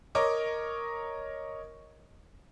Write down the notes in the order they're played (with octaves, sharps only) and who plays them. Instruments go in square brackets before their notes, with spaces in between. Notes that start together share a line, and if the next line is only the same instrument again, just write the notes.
[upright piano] A#4 C#5 D#5 D6